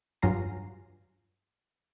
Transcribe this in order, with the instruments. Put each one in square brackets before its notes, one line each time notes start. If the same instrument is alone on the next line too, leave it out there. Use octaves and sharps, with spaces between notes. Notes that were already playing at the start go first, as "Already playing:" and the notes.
[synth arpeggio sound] G2 F#3 F4 G#5 A#5 C7